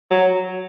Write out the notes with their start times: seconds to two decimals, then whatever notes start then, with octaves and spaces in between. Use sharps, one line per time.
0.11 F#3